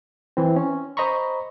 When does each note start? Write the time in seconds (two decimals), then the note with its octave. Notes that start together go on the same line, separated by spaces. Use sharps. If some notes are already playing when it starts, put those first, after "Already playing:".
0.37 E3 C4
0.56 C#4
0.97 C5 D#5 A#5 B5 C#6